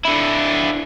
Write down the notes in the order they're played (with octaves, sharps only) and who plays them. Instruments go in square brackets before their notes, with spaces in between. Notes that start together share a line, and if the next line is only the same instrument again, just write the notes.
[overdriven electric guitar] D3 E4